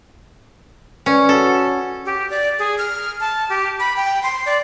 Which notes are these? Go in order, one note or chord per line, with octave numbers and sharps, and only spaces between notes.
C#4 B4 D5
F#4 A4 C#5 F#5
G4
D5
G#4
F6
A5
G4
B5
G5
C6
D5